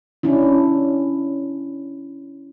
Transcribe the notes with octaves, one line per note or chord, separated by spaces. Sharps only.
C#4 D4 E4